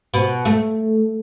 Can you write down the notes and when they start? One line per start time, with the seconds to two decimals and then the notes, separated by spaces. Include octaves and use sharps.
0.14 B2
0.45 A3